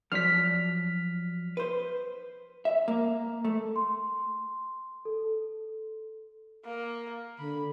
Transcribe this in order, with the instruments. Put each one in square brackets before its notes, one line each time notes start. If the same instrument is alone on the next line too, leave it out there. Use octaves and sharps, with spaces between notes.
[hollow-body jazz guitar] F3 F#3 D4 [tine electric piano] F6 B6
[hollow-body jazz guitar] B4 C5
E5
A#3
A3
[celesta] C6
A4
[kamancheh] A#3
[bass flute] D3 [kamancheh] B5